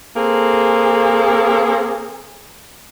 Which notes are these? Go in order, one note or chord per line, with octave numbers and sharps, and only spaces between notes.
A#3 C4 G#4 A4